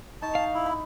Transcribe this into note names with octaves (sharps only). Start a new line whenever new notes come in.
D#4 A5 C#6
F5
E4
B5